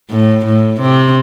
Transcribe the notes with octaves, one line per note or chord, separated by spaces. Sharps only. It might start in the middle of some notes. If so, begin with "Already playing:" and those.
A2
A2
C3